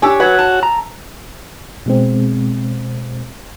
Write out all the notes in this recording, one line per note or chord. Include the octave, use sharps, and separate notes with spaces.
D4 G4 C#5 G#5 E6
F#3 F#4 B4 C#5
A5
A#5
B2 G#3 C4